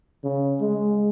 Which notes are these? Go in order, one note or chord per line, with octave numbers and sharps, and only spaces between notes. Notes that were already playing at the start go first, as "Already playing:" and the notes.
C#3
G#3